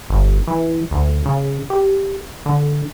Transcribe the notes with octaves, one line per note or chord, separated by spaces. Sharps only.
G1
E3
D2
C#3
G4
D3